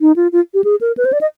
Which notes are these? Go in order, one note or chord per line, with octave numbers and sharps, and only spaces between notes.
D#4
F4
F4
G4
G#4
A#4
B4
C5
D5
D#5